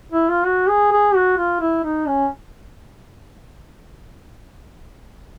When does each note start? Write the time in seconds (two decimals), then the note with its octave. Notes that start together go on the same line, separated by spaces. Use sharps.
0.12 E4
0.30 F4
0.46 F#4
0.69 G#4
0.92 G#4
1.15 F#4
1.38 F4
1.61 E4
1.84 D#4
2.07 C#4